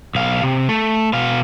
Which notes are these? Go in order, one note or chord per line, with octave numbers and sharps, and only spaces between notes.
B1 F5
C3
A3
B2 F5